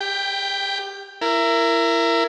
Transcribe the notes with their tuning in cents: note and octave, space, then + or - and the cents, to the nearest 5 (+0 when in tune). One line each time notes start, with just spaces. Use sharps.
G4 +25 G5 +0
E4 +25 A#4 -10